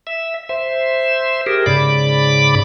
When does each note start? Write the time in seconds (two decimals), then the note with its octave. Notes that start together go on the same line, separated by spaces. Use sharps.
0.07 E5
0.49 C5 E5
1.46 G4 G#4 A#4
1.66 G#2 C#3 D5 B5 D6